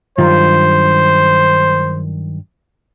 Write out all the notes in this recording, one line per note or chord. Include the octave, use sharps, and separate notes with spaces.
G2 D#3 F#3 F4 C5